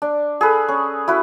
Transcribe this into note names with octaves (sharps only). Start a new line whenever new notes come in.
D4
G#4 A4 B4
C#4
E4 F#4 B4